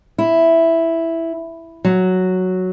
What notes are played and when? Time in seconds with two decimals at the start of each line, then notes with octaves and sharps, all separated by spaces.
0.18 E4
1.85 F#3